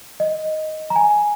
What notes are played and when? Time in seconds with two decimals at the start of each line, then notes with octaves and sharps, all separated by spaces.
0.20 D#5
0.90 A#5
0.96 G#5